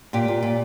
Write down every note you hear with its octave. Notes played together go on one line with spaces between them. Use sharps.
A#2 G4
A#2
A#2